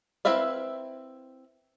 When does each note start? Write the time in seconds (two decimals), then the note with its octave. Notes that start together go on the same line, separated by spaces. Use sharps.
0.25 C4 E4 B4 E5 F5